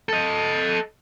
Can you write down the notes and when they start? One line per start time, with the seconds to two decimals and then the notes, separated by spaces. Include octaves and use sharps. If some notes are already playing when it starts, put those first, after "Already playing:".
0.09 A4 D#5